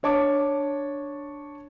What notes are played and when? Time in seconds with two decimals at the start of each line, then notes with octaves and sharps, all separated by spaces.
0.03 D4 C#5 A5 D6